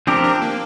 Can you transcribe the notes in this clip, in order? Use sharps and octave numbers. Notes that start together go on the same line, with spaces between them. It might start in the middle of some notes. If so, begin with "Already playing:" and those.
F3 C4 D4 G4 A#4
D4
A#3